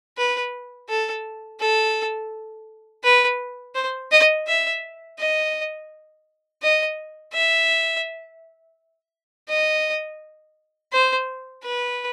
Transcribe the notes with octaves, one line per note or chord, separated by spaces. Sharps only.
B4
A4
A4
B4
C5
D#5
E5
D#5
D#5
E5
D#5
C5
B4